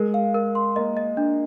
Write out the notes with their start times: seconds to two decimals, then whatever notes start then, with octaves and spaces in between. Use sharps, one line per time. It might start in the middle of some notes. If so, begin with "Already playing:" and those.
Already playing: G#3 A#4
0.14 F5
0.34 A#4
0.55 C6
0.76 A#3 D#5
0.97 D#5
1.17 D4